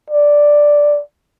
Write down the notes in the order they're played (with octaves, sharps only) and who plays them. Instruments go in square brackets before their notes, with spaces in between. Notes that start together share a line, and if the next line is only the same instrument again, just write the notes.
[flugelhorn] D5